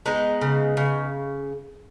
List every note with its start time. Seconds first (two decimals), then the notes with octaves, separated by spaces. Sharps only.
0.06 G#3 B3 D#4
0.41 C#3
0.77 C#3